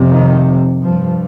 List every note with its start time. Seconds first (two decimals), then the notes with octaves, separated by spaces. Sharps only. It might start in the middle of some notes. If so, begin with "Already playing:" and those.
Already playing: F2 C3
0.11 D#3
0.83 G2 F3